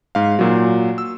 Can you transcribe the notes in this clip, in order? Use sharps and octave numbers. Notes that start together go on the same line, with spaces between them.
G#2 F5
A#2 F#3
E6